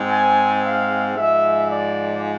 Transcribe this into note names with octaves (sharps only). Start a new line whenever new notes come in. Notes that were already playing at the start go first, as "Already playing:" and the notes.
Already playing: G#2 G#3 C4
G#5
F5
G#2 F3 G#3 E5
D5